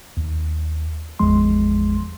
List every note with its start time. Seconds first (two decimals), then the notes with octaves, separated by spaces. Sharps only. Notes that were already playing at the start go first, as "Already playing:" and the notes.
0.17 D#2
1.19 G#1 E2 F3 G#3 C6